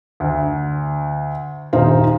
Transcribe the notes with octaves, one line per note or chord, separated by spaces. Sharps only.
D2
D#1 D#4 C5 F5